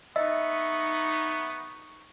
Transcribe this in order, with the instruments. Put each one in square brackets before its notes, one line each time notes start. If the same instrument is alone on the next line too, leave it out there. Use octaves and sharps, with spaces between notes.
[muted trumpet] B3 [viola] D#4 C#6 [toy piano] D#5 [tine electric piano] E5